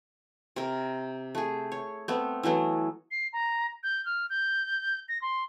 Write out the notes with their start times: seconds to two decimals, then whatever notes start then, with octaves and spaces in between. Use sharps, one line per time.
0.56 C3 A#4
1.35 A3 G#4
1.72 C#5
2.08 A3 B3 C4
2.43 E3 F#3 A3 B3
3.11 C7
3.33 A#5
3.83 G6
4.06 F6
4.30 G6
5.09 A#6
5.22 C6